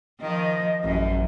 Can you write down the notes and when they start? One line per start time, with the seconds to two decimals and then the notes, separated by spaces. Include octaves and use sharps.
0.20 D#3 F3 D#5
0.84 A1 F#2